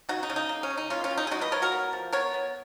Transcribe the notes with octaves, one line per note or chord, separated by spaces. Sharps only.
C#3 D#4 F#4
D#4
C#3
D#4
A#3
C#4
A#3
D#4
A#3 C#4 F4
C#4 F4
D#3
D#4
G#4
G#3 D#4 F#4
B4 D#5
F3 A#4 C#5
F#4 A#4
B3
F3
B3 A#4 C#5
B3